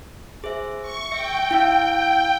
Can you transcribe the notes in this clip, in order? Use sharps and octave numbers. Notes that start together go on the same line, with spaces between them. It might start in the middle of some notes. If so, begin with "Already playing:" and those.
G#4 C5 E5
C#6
E5 G5
E4 F5 E6